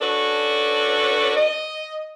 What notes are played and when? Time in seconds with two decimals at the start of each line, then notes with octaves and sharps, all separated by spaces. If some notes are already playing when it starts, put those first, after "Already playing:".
0.01 C#4 D4 F#4 A4 B4
1.36 D#5